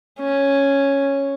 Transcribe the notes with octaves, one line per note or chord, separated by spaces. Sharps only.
C#4